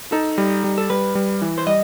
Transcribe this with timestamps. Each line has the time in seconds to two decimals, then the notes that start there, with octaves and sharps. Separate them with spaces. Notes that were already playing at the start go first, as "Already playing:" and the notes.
0.12 D#4 A4
0.38 G3
0.64 G3
0.78 A4
0.90 G3 B4
1.15 G3
1.42 E3
1.58 C5
1.67 G3 D#5